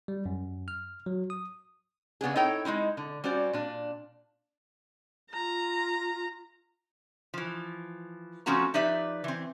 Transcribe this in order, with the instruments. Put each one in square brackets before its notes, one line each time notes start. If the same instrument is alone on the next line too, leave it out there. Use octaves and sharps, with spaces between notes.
[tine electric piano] G3
F#2
F6
F#3
D#6
[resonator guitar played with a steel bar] C#3 B3 D4 G#4
D#4 E4 A4 C#5 G5
G#3 A#3 D#4 E4
D3
G3 C#4 F#4 C5 D5
A#2 D4
[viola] F4 A#5
[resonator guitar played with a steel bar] E3 F3
F3 A3 C4 C#4 F#4 A#5
F3 D#4 G4 B4 D5 E5
E3 C4